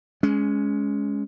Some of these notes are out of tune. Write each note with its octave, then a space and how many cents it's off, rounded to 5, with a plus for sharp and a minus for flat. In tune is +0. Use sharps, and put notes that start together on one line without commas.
G#3 +5 C#4 +20